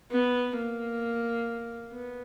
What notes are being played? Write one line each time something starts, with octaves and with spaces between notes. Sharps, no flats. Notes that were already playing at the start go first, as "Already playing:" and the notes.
B3
A#3
B3